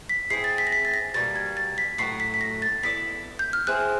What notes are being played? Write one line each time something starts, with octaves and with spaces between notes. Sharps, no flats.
B6
C4 E4 G#4 C7
A6
B6
A#6
B6
A6
A#6
B2 G3 A#3 A6
G#6
A6
B6
A2 F#3 A3 C7
B6
B6
A#6
A6
B3 E4 A4 D5 B6
G6
F6
C4 E4 G#4 C5 F#6